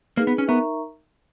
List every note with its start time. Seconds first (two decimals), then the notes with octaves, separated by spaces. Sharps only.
0.17 A#3 D#4 G#4 B4
0.27 B3
0.38 C#4
0.48 B3 D#4 A#4 E5 A#5 C#6